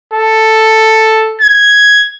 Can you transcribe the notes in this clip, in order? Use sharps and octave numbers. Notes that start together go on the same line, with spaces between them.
A4
G#6